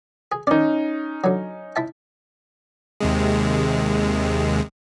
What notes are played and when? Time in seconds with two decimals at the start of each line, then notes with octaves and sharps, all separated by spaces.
0.32 G#4
0.47 D#3 C#4 D#4 D5
1.24 D3 F#3
1.76 E4 E5 A5
3.00 D#2 C3 G#3